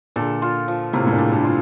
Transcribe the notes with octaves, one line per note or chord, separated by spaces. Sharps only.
A#2 D3 A4
F4
F3
A2 C3 A#3
A2
G2 A#2
A4
G2 A#2
F4